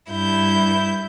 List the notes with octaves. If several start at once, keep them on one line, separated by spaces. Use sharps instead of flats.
G2 E4 G6